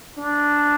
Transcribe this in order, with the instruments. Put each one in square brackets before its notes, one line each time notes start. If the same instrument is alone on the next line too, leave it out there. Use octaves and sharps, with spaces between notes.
[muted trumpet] D4